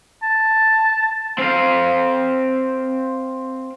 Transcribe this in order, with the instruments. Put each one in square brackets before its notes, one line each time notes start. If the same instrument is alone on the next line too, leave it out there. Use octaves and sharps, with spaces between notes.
[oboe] A5
[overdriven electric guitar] C4 F5